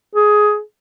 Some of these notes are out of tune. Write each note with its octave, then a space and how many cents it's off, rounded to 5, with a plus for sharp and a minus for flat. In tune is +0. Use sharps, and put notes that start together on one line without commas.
G#4 +10